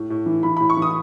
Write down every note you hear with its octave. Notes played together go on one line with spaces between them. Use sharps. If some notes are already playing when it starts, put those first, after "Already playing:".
Already playing: A2
A2
E3
E3 B5
A2 B5
C#6
E3 D#6